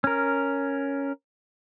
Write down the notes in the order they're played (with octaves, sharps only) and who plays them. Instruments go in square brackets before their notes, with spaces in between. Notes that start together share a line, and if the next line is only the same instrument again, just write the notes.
[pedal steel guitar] C#4 A#4